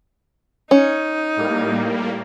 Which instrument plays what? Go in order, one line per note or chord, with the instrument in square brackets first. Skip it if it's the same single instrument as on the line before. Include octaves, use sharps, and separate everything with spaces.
[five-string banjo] C#4 [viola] D#4
[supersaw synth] A2 G3 A#3